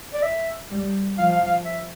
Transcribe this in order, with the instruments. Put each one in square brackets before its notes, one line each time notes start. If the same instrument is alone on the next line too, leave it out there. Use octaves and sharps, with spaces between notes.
[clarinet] D5
E5
[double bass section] G3
[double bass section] F3 [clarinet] F5
[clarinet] F5
F5
E5